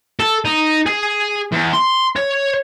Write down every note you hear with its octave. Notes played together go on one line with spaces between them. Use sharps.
A4
D#4
G#4
E2
C6
C#5